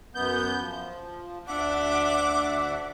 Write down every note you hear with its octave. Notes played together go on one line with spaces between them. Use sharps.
F#2 B3 G6
F3
D2 D4 E5 F#5 D6